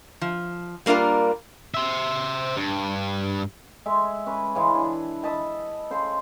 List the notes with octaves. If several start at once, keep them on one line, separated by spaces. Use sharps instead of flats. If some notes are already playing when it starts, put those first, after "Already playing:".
F3
G3 A#3 D4 F4 A#4
C5 E5
G2
G#3 E5
C#4 B4
C#3 E3 G#3
D4
D#5 E5 A5 B5
C#3 C5 C6